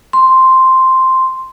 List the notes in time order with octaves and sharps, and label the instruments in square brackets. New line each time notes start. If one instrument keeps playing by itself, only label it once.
[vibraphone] C6